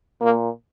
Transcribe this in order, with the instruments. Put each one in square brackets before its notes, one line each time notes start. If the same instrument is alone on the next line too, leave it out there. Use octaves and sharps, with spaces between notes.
[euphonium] A#2 [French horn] A#3